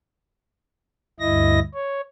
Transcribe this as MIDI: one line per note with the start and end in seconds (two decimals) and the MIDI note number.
1.20 1.60 38
1.20 1.60 43
1.20 1.60 64
1.20 1.60 75
1.20 1.60 94
1.74 2.01 73